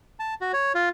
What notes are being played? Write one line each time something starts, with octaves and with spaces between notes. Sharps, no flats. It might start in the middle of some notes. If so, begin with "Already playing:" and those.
A5
F#4
C#5
F4